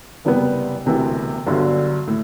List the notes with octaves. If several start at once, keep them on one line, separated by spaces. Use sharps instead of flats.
F#1 E2 C3 G3 B3
E1 D2 C3 E3 B3
G1 G2 D3 F#3
A2